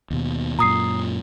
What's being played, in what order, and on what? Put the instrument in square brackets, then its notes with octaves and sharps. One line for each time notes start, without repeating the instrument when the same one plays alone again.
[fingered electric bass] D#2 B2
[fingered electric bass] F#2 A#2 [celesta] A#5 D#6 C7